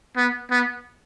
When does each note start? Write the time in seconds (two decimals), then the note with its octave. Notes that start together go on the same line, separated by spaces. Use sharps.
0.17 B3
0.51 B3